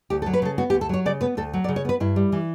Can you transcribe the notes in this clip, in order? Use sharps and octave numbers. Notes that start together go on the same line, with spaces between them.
D2 G4
A4
F#3
B4
C#3 A4
B3 F#4
G4
D2
A4
F#3 C#5
C#3 D5
B3 B4
D2 A4
F#3
D5
C#3
C#5
B3 B4
G2 E4
G3
E3